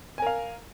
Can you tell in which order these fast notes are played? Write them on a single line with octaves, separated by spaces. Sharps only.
G#5 A#4 F5